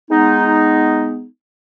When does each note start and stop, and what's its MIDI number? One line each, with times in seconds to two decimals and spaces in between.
0.10 1.24 56
0.10 1.24 59
0.10 1.24 63